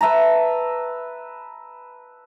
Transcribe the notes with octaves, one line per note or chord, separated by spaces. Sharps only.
B4 E5 A5 A#5